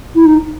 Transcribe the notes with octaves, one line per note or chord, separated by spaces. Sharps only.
E4
D#4